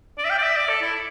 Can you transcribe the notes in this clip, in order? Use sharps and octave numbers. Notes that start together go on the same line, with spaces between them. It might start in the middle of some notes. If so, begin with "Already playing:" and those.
D5
E5
G5
D5
E5
D5
A4
E4